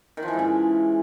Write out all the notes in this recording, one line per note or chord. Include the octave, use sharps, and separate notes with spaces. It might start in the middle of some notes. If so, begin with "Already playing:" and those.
D#3
F3
E3
G#2
C#3